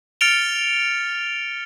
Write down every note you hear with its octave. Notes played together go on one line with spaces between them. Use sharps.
F6 A6 C#7 D7 F7 G7